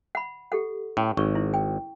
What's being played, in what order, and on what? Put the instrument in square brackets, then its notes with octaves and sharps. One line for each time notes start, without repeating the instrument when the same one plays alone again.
[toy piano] F#5 B5
G4 A4 F#5
[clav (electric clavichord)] A2 [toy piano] C#4
[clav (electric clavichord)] G#1 [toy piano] C#6
[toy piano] E4
G5